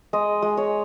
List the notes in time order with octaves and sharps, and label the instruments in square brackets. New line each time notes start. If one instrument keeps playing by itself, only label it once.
[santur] G#3 D#5
G#3
C#5